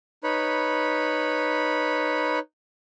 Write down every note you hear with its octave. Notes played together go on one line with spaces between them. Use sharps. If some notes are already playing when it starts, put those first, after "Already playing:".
D#4 B4 C#5 B5